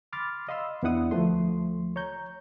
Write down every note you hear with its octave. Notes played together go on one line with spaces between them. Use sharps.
B5 C6 D6 F6 A6
D#5 F5 B5 C6 E6
E2 B3 D4 E4 F#5 D#6
D2 F3 A3 C6
C#5 A#5 G6